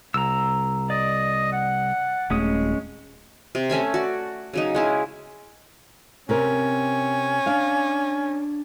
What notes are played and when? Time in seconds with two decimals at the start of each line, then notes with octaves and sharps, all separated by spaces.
0.14 C2 A#5 E6
0.90 D5 D#5
1.52 F#5
2.30 D#1 G#3 A3 C#4 D#6
3.55 C3
3.70 A3 C#4 E5 G#5
3.94 F#4 D5
4.53 C#3 F#3 D#4
4.75 G#3 C#4 E4
6.29 C3 C4 C#4 A#4
7.46 D4 D5 F5